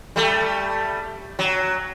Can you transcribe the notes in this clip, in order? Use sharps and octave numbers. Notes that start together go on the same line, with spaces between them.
G3 A3
F#3